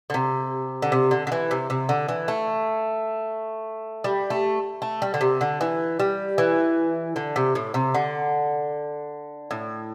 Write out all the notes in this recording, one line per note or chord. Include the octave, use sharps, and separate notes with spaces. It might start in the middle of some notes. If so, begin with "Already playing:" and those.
D3
C3
D3
C3
D3
D3
E3
C3
C3
D3
E3
A3
G3
A3
A3
G3
D3
C3
D3
E3
G3
E3
D3
C3
A2
C3
D3
A2